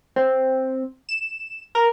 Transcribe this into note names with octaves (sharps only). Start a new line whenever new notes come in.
C4
E7
A#4